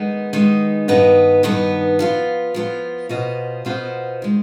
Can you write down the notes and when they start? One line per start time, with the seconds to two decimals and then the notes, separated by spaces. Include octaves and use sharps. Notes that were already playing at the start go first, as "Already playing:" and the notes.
Already playing: D#3 G#3 B3 D#4
0.33 D#3 G#3 B3 D#4
0.88 G2 D#3 B3 D#4 B4
1.43 G2 D#3 B3 D#4 B4
1.99 F3 B3 F4
2.54 F3 B3 F4
3.09 B2 B3 F4 C5 D#5
3.65 B2 B3 F4 C5 D#5
4.22 D#3 G#3